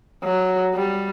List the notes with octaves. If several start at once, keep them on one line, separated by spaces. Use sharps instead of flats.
F#3
G3